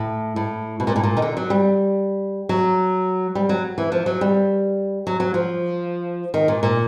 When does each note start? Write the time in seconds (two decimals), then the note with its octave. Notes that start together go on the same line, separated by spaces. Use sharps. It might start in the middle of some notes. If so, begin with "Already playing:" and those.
Already playing: A2
0.36 A2
0.80 B2
0.87 A#2
0.96 A2
1.03 A#2
1.17 D#3
1.22 D3
1.37 F#3
1.50 G3
2.49 F#3
3.35 G3
3.49 F#3
3.78 E3
3.92 F3
4.06 F#3
4.21 G3
5.07 F#3
5.20 F#3
5.34 F3
6.34 D#3
6.48 A#2
6.63 A#2